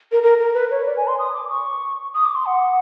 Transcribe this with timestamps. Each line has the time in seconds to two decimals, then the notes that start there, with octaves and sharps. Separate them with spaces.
0.12 A#4
0.23 A#4
0.39 A#4
0.54 B4
0.71 C#5
0.86 D5
0.97 G#5
1.07 C6
1.19 D#6
1.34 D6
1.50 C#6
2.15 D#6
2.25 D6
2.35 C6
2.46 F#5